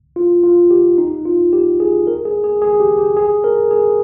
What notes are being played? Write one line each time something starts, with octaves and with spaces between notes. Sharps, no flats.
F4
F4
G4
D#4
F4
G4
G#4
A#4
G#4
G#4
G#4
G4
G4
G#4
A#4
G#4